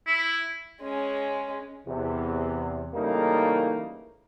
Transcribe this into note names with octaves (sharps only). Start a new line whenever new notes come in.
E4
G#3 C#4
E2 C3
C#3 E3 G3 A3 A#3 D#4